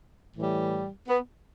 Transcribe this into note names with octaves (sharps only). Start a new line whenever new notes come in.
A2 E3 G3
B3